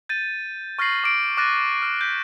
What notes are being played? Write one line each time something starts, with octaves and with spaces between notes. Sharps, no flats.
G6 A6 D#7
C#6 F6 A6 A#6 C7 F#7
D6 F6 D7
D6 F6 F#6 A6 A#6 D#7
F6
G6 B6